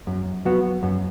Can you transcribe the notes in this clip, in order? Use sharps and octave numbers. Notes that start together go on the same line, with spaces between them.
F#2
F#3 B3 F#4
F#2